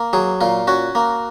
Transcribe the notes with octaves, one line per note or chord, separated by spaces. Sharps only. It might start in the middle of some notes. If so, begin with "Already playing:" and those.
Already playing: A#3
F#3 G#4
A#2 F4
C#4 F#4
A#3